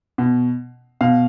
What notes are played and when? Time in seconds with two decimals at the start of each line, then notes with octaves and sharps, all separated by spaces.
0.18 B2
1.01 B2 F5